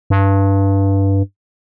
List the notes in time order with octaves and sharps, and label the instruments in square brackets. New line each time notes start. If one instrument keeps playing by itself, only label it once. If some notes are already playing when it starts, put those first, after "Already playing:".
[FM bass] G2